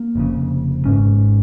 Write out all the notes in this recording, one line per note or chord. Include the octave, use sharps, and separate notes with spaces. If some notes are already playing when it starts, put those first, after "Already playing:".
Already playing: A#3
F1 F2 C#3
G#1 G#2 C#4